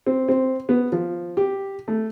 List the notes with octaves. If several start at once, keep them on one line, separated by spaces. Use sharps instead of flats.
C4
C4
B3
F3
G4
A3